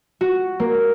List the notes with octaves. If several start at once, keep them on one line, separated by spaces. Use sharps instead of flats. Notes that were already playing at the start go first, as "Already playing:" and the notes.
F#4
A#3